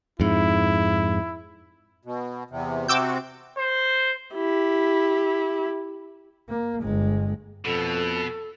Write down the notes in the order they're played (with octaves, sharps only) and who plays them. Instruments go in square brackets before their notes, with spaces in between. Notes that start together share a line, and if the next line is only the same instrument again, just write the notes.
[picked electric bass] F2 G#2 [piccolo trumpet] E4
[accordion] B2
E2 C3
[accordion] C3 C4 F#4 [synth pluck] D6 E6 G6
[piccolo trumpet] C5
[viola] E4 G4
[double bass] A#3
G1 G#3
[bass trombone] F2 [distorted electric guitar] B2 [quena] A4